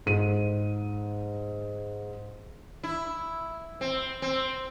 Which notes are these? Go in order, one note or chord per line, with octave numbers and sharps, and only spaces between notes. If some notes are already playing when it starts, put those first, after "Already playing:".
G#2 D#7
E4
C4
C4